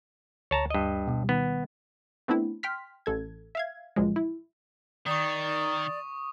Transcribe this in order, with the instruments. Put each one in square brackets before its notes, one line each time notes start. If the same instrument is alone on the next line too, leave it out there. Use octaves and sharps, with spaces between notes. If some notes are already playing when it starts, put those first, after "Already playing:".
[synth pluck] D2 [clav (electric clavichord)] C#5 A5 A#5
[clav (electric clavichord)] G2 D#5
[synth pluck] B2 G3
[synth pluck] D#3 [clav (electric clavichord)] B3
[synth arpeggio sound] A3 B3 C4 D4 E4
G5 C6 F6 B6
A1 A4 G#6
E5 F5 G#6
C#2 A#2 F3 F#3 G#3
E4
[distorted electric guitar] D#3 [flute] D5 [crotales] C#6 D#6